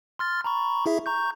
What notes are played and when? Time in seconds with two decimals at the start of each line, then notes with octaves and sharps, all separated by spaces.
0.19 C6 F6 A6
0.44 A#5 B5 C#6
0.86 E4 G#4 E5
1.06 A#5 C#6 G6